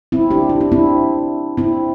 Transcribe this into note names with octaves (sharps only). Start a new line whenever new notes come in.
C4 E4
D4 G4
E4
D4
C4 E4
C4 E4